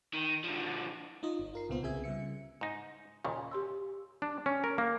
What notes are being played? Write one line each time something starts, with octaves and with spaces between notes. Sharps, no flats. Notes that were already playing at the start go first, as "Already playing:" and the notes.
D#3
D3 F3
D#4 F4 D#5
G1
F4 A#4 C7
C#2 A#2 B3 F4 C5
C2 C#3 C4 G#4 E5 G#6
C#3 G3 E5 C#7
G#2 D#4
D#2 A#2 C#3
G4 C6 E6
D4
C#4
A#4
A#3